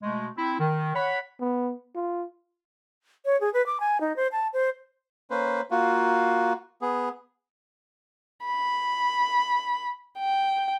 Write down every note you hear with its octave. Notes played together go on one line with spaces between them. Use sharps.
B2 G#3 A3
C4 E4
D#3
C#5 F#5 B5
B3
F4
C#5
G#4
B4
D6
G#5
D#4
C5
A5
C5
A#3 C#4 B4 C5
A#3 F4 F#4
B3 G#4
B5
G5